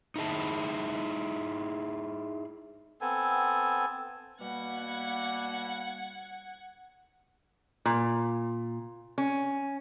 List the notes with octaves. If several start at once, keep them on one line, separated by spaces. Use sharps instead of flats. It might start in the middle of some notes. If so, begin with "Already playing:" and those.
D#4 E4 G#4 A5
B3 C4 A4 G#5
B2 G3 A#3 F#5 G#6
A#2
C#4